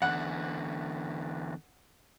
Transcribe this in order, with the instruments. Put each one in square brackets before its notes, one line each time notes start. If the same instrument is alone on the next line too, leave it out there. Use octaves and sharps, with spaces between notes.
[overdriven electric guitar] E2 D3 [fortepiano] F#5